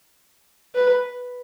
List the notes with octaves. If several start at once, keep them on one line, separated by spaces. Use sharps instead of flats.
B4